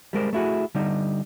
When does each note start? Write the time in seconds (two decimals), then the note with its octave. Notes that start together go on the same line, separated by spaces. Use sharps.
0.13 G3 G#3 A#4 C5
0.33 A3 E4 F#4 G#4
0.75 D3 G3 D#4